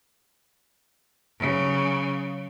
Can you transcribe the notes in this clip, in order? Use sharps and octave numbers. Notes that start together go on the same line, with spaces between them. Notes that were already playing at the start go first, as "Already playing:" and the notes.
C#3 F#3